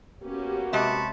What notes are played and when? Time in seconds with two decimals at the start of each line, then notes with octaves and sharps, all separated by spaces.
0.23 A#3 B3 C#4 F#4 G4
0.73 C3 G#3 E5 A5 B5 C#6